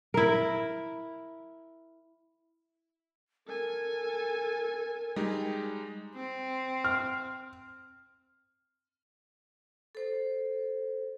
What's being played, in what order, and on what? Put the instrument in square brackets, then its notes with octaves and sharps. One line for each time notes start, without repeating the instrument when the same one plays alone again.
[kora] E4 A#4
[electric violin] A4 G#5 [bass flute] A#4
[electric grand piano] G3 G#3 D#4
[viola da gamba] C4
[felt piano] F6
[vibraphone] A4 C5